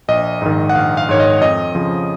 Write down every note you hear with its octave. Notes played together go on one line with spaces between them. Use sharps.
A#1 D#5
G#2 D#3
F#5
A#1 F5
F5
G#2 D#3 C#5
D#5
F2 D#5
C#3 F3